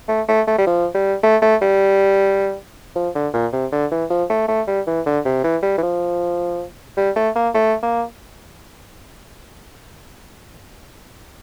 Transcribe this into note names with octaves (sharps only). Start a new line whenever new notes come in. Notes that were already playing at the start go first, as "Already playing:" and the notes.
A3
A3
A3
G3
F3
G3
A3
A3
G3
F3
D3
A#2
C3
D3
E3
F3
A3
A3
G3
E3
D3
C3
E3
G3
E3
F3
G3
A3
A#3
A3
A#3